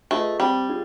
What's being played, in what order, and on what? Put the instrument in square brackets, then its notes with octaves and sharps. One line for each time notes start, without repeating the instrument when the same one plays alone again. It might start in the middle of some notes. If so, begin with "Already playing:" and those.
[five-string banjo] A3 [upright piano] F4 G#4 B4 D#5
[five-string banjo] G3 [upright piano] C4
[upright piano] F4 G#4